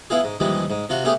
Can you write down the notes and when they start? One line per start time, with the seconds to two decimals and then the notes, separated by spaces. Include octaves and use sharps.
0.10 B3 E4 F4 G#4
0.24 G#2
0.40 D#2 E3 F3 G3 G#3
0.70 G#2
0.90 C3 F4 F#4 C#6
1.04 A3 B3 C#4 G4 G#4